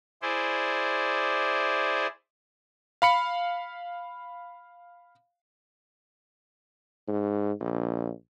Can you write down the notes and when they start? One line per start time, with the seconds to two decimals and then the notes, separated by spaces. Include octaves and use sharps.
0.22 E4 G#4 C5 D5
3.02 F5 B5 C#7
7.08 G#2
7.60 A#1